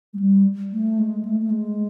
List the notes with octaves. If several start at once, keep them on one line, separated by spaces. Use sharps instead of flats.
G#3
G3
A3
G#3
A3
A3
G#3